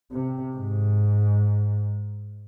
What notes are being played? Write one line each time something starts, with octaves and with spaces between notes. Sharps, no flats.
C3
G#2